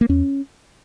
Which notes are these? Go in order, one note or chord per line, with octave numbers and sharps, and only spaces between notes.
A#3
E2 C#4